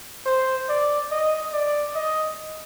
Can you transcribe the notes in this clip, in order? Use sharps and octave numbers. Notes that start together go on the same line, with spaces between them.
C5
D5
D#5
D5
D#5